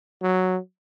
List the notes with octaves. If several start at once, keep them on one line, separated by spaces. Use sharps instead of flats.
F#3